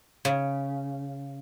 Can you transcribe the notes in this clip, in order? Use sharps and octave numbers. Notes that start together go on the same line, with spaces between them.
C#3